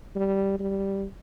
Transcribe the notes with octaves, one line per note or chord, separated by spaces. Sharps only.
G3
G3